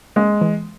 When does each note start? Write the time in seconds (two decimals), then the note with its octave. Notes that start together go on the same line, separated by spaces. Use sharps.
0.16 G#3 A#3
0.41 E3